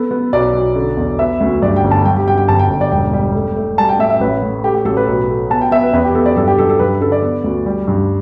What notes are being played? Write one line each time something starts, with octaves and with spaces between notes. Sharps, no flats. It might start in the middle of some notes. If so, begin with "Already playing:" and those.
Already playing: B3 A4
B3
B1 D5
B1
D3
E2
B3 E5
D2
G2 D5
G5
G1
A5
G2 G5
G4
G2 G5
G5
G1 A5
G5
G1
D5
E1 G5
G3
A3
A3
G3 A5
G5
A2 E5
E5
A1 B4
A2
A3 G4
G4
A1 A4
B4
B1
A3
B3 A5
G5
B3 E5
B4
E2 B4
G4
B3 A4
D5
G2 A4
G4
G2 A4
A4
G2 B4
D3 A4
D5
B3
D2
G3
G2